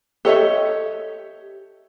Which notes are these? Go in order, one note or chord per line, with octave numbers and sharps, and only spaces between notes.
G4 A4 C#5 D#5 E5